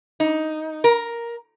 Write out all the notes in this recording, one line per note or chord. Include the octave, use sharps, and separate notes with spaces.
D#4
A#4